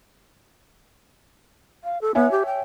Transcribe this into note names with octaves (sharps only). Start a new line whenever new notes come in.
F5
A4
B3 C#5 E5 G#5
G4
G5